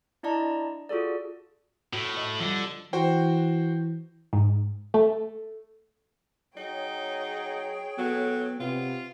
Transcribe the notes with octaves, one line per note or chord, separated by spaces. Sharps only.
D4 E4 D5 D#5 A5 A#5
F4 F#4 G#4 A4 D5
A2 F#4
D#5
D3 F3 G3
E3 F#4 C5 G5
G#2
A3
F#3 D#4 G#4 C#5 G5
F#3 B3 A4
C3 B3 F4